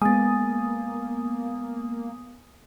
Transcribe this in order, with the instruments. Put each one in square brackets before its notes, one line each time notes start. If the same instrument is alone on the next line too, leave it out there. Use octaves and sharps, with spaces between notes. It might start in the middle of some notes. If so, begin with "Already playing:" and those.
[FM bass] G#3 [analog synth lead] A#3 [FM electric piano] B3 D#6 [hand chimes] G#5 A6